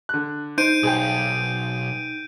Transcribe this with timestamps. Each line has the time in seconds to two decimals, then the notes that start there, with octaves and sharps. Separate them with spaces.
0.09 D3 F#6
0.58 D#4 C5 G6 D7 D#7
0.83 B1 G#4 C5 G5